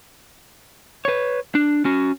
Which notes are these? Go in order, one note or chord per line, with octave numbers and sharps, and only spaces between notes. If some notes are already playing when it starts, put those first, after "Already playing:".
B4 C#5
D4
C#4 F#4